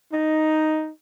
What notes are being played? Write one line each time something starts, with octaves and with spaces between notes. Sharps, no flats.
D#4